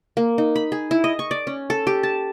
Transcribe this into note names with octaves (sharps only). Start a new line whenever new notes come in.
A#3
D#4
B5
G#4
E4
D#5
C#6
D5
C#4
A4
G4
A5